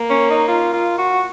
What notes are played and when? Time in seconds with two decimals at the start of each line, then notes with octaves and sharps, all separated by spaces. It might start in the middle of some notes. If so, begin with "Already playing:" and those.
Already playing: A#3
0.10 C#4
0.30 D#4
0.48 F4
0.73 F4
0.98 F#4